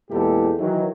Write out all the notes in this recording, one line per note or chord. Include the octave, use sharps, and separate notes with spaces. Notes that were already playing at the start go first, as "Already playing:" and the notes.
E2 A#2 G#3 E4 G4 A4
D#3 E3 F#3